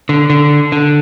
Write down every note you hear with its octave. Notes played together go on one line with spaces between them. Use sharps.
D3
D3
D3